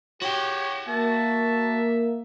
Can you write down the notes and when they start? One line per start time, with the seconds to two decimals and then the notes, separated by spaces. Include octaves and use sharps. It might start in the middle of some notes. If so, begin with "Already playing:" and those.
0.22 F#4 G4 C#5 G5
0.88 A#3 E5 A5